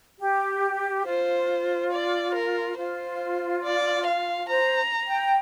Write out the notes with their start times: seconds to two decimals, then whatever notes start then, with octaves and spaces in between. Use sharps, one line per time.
0.20 G4
1.06 F4 C5
1.92 D5
2.35 A#4
2.77 F4 C5
3.63 D5
4.06 F5
4.49 C5 A#5
5.07 G5